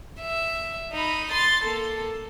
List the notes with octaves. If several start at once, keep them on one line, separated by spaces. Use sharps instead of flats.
E5
D#4 B5
C6 A6
A#3 A4